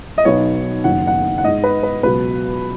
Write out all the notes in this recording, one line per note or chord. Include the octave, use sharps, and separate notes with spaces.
D#5
B1 B2 B3 D#4 C#5
F#1 F#2 D#3 F#5
F#5
F#5
G#2 G#3 D#4 D#5
B4
B4
C#2 B2 F#3 B4